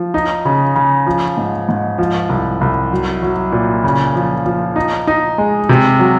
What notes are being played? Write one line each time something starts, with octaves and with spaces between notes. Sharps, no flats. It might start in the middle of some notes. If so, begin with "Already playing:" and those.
Already playing: F3
D#4
C#3
C#3
F3
G#2
G#2
F3
C2
C2
F#3
F#3
A#2
C#3
F3
F3
D#4
D#4
G#3
C3
F#3